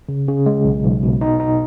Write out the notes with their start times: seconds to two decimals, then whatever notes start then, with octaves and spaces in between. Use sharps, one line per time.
0.09 C#3
0.28 C#3
0.46 G#3
0.65 B1
0.84 B1
1.03 B2
1.21 D#4
1.40 D#4